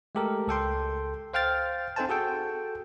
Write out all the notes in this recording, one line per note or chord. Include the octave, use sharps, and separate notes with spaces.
G#3 A3 G4 A4 A#4
C#2 A4 G5 C6
C5 F5 G5 F6 A6
C4 D#4 A4 C5 G#5 A5
F#4 G#4 A4 G5